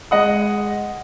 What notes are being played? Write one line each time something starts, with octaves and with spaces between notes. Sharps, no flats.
G#3 D#5 F#5 D#6